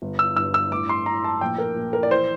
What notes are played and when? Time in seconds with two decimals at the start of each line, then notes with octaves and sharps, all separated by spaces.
0.02 G1
0.19 E6
0.36 G2 E6
0.54 E6
0.71 A2 D6
0.89 C6
1.06 A2 A#5
1.24 A5
1.41 A#1 G5
1.58 A#4
1.76 A#1
1.93 A#4
2.03 D5
2.10 E3 C5